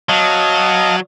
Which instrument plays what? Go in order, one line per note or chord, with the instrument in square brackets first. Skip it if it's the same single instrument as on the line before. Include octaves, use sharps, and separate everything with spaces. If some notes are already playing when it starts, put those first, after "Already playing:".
[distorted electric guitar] F#3 [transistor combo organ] D#5 F5 A5